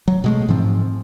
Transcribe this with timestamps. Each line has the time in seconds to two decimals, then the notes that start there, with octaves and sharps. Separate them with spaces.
0.08 F#3
0.24 B2 G#3 A3
0.49 G#2 E3 F3 C4